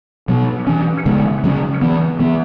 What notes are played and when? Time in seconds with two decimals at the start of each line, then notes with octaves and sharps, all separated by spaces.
0.28 B2 F#3 B3
0.67 E3 C#4
1.06 C#3 G#3 B3
1.44 C#3 F#3 C#4
1.82 E3 B3
2.19 E3 B3